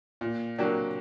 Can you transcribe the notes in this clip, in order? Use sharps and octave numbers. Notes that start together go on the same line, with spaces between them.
A#2
F#3 A#3 D4 G4